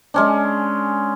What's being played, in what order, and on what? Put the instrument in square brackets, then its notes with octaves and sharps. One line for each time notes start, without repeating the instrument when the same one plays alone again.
[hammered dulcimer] G#3 C#4 D4